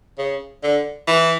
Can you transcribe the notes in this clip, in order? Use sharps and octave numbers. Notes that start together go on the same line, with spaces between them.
C#3
D3
E3